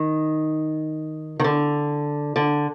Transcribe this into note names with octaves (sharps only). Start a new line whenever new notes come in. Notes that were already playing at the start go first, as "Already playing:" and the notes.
Already playing: D#3
D#3
D3
D3